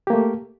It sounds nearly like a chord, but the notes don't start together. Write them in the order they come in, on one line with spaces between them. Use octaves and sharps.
G4 A#3 A3